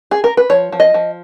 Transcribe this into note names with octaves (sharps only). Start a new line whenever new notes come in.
G#4
A#4
B4
F3 C#5
F3
D#5
F3